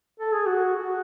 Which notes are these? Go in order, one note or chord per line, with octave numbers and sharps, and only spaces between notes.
A4
G#4
F#4
F#4